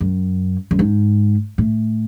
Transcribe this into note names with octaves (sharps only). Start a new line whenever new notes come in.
F#2
F#2
G#2
A2